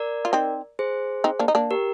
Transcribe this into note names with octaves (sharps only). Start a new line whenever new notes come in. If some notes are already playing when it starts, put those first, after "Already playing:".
Already playing: A#4 D5
F4
C4 D#4
G#4 C5
C4 D#4
A#3 D4
D#4
A#3 D4
G4 A#4